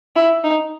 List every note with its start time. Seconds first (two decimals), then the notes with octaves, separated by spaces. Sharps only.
0.16 E4
0.44 D#4